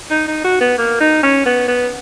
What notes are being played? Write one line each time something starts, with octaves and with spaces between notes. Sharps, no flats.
D#4
D#4
F#4
B3
A#3
D#4
C#4
B3
B3